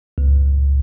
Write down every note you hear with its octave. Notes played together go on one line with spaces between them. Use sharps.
C#2